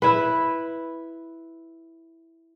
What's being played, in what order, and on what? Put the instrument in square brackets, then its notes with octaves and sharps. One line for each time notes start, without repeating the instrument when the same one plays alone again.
[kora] E4 B4